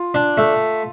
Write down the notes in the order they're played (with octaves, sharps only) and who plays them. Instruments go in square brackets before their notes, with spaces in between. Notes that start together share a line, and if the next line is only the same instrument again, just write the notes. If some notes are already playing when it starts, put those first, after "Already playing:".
Already playing: [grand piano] F4
[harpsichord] D4
A3